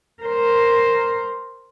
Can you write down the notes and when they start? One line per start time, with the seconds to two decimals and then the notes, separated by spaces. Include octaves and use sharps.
0.23 A#4 C5